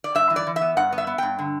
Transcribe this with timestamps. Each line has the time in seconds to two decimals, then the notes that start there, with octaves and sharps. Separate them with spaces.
0.04 D5
0.15 G2 E5
0.30 E3
0.36 D5
0.47 E3
0.56 E5
0.61 B3
0.77 G2 F#5
0.92 B3
0.98 E5
1.07 B3
1.18 G2 G5
1.39 D3